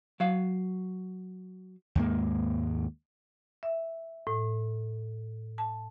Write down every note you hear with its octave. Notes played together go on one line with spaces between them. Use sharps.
F#3 F5
D#2 G#2 G#3 A#3
E5
A2
A5